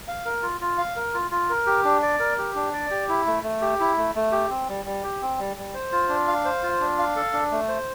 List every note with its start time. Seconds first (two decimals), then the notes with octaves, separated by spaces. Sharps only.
0.08 F5
0.25 A#4
0.42 F4
0.61 F4
0.78 F5
0.96 A#4
1.14 F4
1.31 F4
1.50 A#4
1.67 G4
1.85 D4
2.02 D5
2.20 A#4
2.38 G4
2.55 D4
2.74 D5
2.90 G4
3.09 E4
3.26 A3
3.43 A3
3.62 G4
3.80 E4
3.97 A3
4.15 A3
4.32 G4
4.50 C4
4.68 G3
4.85 G3
5.03 G4
5.22 C4
5.39 G3
5.57 G3
5.74 C5
5.92 F4
6.09 D4
6.28 F5
6.45 C5
6.63 F4
6.80 D4
6.99 F5
7.16 A4
7.33 D4
7.51 A3
7.68 C5